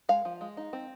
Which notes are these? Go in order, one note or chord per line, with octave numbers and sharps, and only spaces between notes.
G#3 F5
F3
G#3
D#4
C4